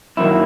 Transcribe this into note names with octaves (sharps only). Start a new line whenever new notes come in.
F#2 D#3 F#3 A#3 E4